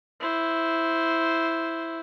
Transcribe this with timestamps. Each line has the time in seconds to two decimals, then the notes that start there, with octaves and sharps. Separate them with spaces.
0.21 E4 C5